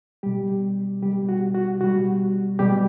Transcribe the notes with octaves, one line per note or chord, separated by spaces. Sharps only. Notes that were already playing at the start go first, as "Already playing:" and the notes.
B2 G3 G4
B2 G3 G4
F#4
F#4
B2 G3 F#4
B2 G3 G4